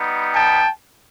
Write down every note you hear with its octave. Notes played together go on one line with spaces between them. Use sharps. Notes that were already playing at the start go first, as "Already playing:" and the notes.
Already playing: G3 B3 D#4
G5 A5